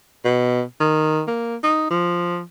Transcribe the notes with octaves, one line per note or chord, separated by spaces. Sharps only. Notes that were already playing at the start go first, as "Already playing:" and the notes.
B2
D#3
A#3
D#4
F3